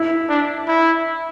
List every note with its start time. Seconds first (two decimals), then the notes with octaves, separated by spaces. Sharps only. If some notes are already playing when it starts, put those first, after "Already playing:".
Already playing: E4
0.29 D4
0.68 E4